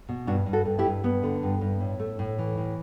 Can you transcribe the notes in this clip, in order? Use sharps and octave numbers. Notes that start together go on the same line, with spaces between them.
B2
G2 D4 F#4
G2
F#4 A4
G2
E4 G4
G2
G2 B3
D3
G2
G2
A2
A3
A2
E3
A2